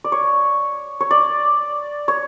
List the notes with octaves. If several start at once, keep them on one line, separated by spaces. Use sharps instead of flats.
D5
C#5
C#5
D5
C#5